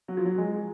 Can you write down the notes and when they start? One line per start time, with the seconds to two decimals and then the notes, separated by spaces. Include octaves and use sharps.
0.08 F#3
0.17 F3
0.25 F#3
0.38 G#3